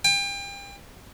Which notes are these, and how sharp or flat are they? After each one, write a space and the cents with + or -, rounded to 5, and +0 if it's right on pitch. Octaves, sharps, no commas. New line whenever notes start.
G5 +35